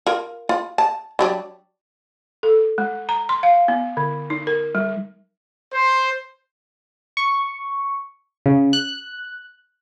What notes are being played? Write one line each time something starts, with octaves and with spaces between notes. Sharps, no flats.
F4 A#4
F4
A5
F#3 G3 D4
A4
G#3
A#5
C6
F5
B3
D3
D#4
A#4
G3
C5
C#6
C#3
F#6